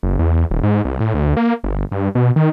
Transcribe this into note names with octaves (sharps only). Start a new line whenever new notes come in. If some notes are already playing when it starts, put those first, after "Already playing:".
F#1
E2
D#1
G#2
C2
A2
D2
A#3
G1
G2
B2
D#3